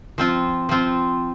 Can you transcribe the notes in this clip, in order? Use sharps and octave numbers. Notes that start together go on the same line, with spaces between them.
F3 C4 F4
F3 C4 F4